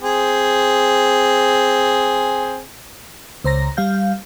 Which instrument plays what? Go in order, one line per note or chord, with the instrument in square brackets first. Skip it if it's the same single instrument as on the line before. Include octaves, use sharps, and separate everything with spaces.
[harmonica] C4 G#4
[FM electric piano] C#2 C5 A#5 A#6
G3 F5 G6